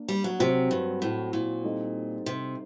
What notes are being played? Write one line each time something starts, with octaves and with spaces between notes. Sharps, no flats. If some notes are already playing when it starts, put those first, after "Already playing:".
Already playing: A#3 D4
G3
F#3
C3 F#3 C4 F#4 C5
G2
A2
A#2
G3 C4 D#4 A4 D#5
C3